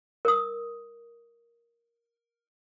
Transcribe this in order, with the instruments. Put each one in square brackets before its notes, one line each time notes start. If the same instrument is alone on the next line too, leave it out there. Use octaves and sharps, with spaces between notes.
[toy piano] A#4 D#6